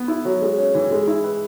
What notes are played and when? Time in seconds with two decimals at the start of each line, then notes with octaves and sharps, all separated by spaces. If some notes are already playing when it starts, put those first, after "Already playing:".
Already playing: B3
0.08 E4
0.25 F#3
0.42 G#3
0.58 C#4
0.75 E3
0.91 G#3
1.07 E4
1.24 B4